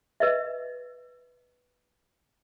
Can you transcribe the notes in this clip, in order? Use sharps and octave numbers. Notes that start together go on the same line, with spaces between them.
B4 D#5 E5